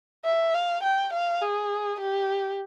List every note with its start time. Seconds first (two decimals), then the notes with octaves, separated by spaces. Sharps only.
0.25 E5
0.54 F5
0.83 G5
1.13 F5
1.42 G#4
2.01 G4